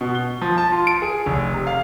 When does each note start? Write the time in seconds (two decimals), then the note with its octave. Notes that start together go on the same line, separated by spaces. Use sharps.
0.01 B2
0.15 G7
0.42 F3
0.57 A5
0.72 F4
0.87 D7
1.02 G#4
1.26 F1
1.54 C3
1.67 F5